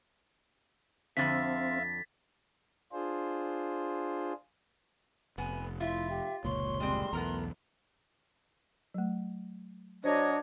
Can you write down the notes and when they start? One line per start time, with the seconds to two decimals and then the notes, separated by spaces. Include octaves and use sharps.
1.17 F2 G#2 D3 C4 E5 F5 A6 B6
2.92 D4 F4 G#4 C5
5.38 F1 B3 G#5
5.80 E4 F4 E5
6.10 G4
6.45 F1 C#2 A#2 C#5 C6
6.80 G3 G#3 C4
7.13 B1 E2 A3 B3 A#4 A#5
8.94 F#3 A3
10.04 F#3 D4 C5 C#5 D#5